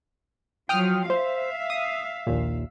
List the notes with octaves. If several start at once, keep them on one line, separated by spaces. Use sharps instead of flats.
F3 F#3 G5 D#6 F6
C5 E5 F5
D#6
A#1 D#2 A#2